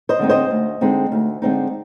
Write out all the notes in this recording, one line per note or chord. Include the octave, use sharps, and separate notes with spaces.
C5 D#5
D3 G#3 C4 D#4
C5 D#5
D2
D3 G#3 C4 D#4
D2
D3 G#3 C4 D#4